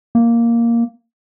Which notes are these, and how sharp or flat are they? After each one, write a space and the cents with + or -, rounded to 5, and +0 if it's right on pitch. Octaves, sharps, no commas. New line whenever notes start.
A#3 +0